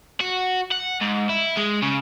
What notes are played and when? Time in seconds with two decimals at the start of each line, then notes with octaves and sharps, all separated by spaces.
0.21 F#4
0.72 F#5
1.01 G#2
1.29 E4
1.57 G#3
1.82 C#3